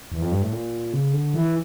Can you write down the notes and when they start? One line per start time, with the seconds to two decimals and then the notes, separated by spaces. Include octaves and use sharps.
0.12 E2
0.22 F2
0.32 G2
0.42 A2
0.52 A#2
0.93 C#3
1.13 D3
1.34 E3